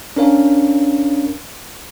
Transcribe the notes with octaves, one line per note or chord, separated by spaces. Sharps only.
C#4 D4 A#4 C#5 F5